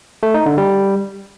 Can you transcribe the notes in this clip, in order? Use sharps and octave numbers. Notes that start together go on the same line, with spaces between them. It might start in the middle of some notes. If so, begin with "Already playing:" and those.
A3
D#4
D3
G3